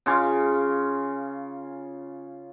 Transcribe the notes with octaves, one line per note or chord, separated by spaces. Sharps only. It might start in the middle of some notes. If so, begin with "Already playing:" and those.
C#3 F4 G#5 D6